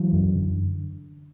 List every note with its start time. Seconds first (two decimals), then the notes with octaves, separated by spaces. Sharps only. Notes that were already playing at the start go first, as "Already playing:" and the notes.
Already playing: E3 F#3
0.13 F#2
0.35 D3